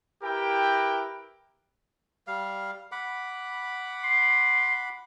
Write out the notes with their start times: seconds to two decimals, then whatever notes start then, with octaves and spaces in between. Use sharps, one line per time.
0.22 E4 G4 A#4 B4 G5
2.27 G3 F5
2.92 F#5 B5 D6
4.04 C6